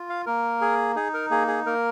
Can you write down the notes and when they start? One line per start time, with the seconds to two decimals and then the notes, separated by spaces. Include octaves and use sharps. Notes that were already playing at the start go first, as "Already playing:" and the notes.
Already playing: F4
0.10 F5
0.26 A#3 A#4
0.61 G#4
0.96 D#4 G#4
1.14 A#4
1.30 A#3 G#4
1.48 G#4
1.66 A#3 A#4